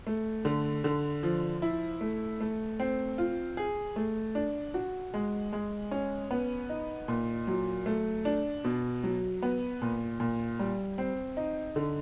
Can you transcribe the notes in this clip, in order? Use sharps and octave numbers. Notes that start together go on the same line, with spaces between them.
A3
D3
D3
F3
E4
A3
A3
C4
F4
G#4
A3
D4
F#4
G#3
G#3
C#4
B3
D#4
A#2
F#3
A3
D4
B2
F#3
B3
A#2
A#2
G3
C4
D#4
D3